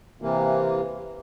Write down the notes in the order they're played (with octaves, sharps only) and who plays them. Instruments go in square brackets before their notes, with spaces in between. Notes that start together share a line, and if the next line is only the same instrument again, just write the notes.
[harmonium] C3 E3 A#3